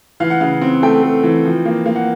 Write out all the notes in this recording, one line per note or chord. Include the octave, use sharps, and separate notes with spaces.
E3 F5
F#5
C#3 F5
C4
A3 G5
A3
E3
F3
A#3
A#3
F#5